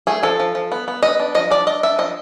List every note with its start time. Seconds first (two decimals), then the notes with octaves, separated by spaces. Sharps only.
0.07 A3 G#4
0.23 F3 A4
0.40 F3
0.55 F3
0.72 B3
0.88 B3
1.03 B3 D#5
1.20 D4
1.35 F3 D#5
1.51 D4 D5
1.67 D4 D#5
1.83 D4 E5
1.98 F3 D#5